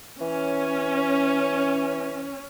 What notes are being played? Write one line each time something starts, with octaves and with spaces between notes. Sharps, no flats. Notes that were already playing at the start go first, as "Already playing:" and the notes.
E3 C#4